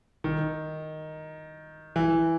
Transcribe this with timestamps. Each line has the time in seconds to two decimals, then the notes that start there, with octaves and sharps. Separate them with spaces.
0.24 D#3
1.96 E3